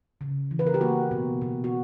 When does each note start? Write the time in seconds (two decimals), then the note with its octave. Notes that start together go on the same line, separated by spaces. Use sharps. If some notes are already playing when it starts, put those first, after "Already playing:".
0.21 C#3
0.51 E3
0.59 B4
0.66 A#4
0.74 G4
0.81 A#3 F#4
1.11 B2
1.42 B2
1.64 F#4